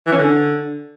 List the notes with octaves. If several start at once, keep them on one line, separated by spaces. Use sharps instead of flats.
E3
C#4
D3